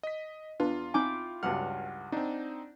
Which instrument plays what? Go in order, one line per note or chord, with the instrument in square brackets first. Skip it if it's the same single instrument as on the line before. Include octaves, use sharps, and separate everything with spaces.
[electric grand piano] D#5 B6
[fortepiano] E2 [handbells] D4 B4 [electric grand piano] F4
[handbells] C4 D#4 G#5 [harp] E4 G5 D6
[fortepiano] C#2 G2 F#3 [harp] F#5 [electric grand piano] F6
[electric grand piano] C4 D#4 [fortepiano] D4